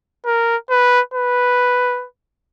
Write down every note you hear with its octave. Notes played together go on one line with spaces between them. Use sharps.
A#4
B4
B4